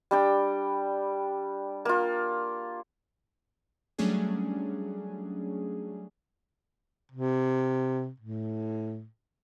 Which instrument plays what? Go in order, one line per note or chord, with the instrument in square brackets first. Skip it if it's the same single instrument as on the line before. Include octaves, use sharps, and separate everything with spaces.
[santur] G3 D4 G5
A#3 F4
[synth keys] F#3 G3 A3 C#4 D4 G#4
[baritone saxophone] C3
A2